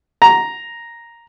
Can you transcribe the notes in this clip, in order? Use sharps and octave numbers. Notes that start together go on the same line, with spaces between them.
A#5